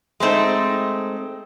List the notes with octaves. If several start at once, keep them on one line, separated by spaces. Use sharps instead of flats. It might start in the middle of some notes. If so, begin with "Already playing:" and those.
G#3 A3 C4 D#4